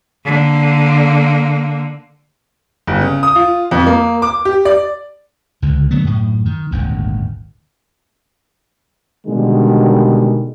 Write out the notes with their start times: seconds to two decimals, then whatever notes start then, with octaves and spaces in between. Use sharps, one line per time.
0.25 D3 A#3
2.87 G1
3.01 C#3
3.23 D#6
3.36 F4
3.71 F2
3.87 A#3
4.22 D6
4.45 G4
4.65 D5
5.62 C#2 D3
5.91 D3 F#3 A3 B3
6.04 F#2 A2
6.46 D#3
6.71 D#1 G#1 D2
9.27 B2 D3 D#3 G3 G#3